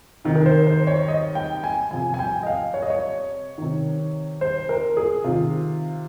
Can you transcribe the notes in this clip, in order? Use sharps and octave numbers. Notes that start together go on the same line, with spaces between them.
C3 D#3
A#4
C5
C5
C#5
D#5
G5
G#5
C3 F3 G#5
G#5
G5
D#5
F5
C#5
D#5
C#5
C3 D#3
C5
A#4
G#4
C3 D#3 F4